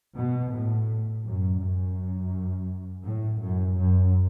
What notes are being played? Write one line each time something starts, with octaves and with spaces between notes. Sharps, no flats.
B2
A2
F#2
F#2
A2
F#2
F#2